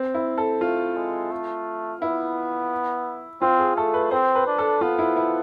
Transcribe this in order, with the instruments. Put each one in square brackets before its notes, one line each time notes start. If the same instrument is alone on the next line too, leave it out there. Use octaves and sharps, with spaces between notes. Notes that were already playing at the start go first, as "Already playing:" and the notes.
Already playing: [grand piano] C4
E4
A4
[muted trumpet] A3 [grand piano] F4
[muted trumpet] G#3
A3
[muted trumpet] B3 [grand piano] E4
[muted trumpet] C4 [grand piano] F4
[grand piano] G#4
[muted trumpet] A3 [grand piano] A4
[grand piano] B4
[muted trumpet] C4 [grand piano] C5
[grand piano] B4
[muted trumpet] D4
[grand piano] A4
[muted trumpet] B3 [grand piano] F4
[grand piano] E4
E4